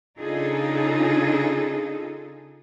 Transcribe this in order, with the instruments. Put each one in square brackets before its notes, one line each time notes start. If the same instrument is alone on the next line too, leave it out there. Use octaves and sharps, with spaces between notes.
[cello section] C#3 D4 D#4 F4 G#4 A4